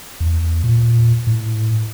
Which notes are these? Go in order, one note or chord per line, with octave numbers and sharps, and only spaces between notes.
E2
A#2
A2